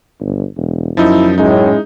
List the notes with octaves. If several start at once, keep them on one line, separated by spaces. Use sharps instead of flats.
G1
E1
F#2 F3 D#4 E4
A2 G#3 C#4 D#4 E4